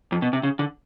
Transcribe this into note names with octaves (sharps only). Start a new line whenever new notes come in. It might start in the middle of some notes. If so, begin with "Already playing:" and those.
F2
B2
C3
C#3
D3